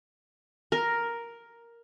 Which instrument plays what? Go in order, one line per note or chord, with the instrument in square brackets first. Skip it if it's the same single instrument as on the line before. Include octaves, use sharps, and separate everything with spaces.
[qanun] A#4